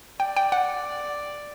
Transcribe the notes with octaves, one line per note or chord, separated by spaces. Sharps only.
D5 G5
G5
F#5